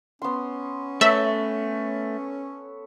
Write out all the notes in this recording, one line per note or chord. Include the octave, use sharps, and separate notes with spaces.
B3 C#4 C6
A3 A4 B4 C#5 E5